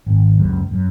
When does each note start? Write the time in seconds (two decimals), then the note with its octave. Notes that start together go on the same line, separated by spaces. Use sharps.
0.06 G#1
0.38 C#2 F#2
0.71 F#2